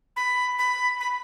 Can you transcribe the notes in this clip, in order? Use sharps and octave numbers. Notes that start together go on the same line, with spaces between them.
B5
B5
B5